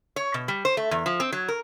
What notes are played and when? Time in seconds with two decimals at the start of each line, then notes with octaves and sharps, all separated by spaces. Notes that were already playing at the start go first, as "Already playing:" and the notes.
0.16 C#5
0.34 B2
0.48 G3
0.65 C5
0.77 A3
0.91 E2
1.06 F3
1.20 C4
1.33 F#3
1.48 A#4